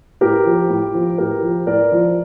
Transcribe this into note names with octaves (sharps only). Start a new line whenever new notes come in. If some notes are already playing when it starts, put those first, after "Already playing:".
A2 G4 A#4
F3
A2
F3
A2 G4 A#4
F3
A2 A#4 D5
F3